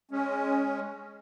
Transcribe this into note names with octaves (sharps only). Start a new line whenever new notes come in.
G#3 C#4